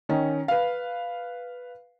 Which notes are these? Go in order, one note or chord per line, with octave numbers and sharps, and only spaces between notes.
D#3 C#4
B4 F5